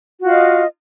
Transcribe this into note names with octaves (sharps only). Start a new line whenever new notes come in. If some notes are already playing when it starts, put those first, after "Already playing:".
F4 F#4 D#5 F5